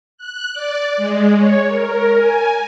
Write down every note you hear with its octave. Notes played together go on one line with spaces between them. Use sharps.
F#6
D5
G#3
C#5
A#4
G#5